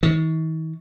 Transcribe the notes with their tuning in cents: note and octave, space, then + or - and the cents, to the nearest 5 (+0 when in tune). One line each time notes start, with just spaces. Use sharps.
D#3 +45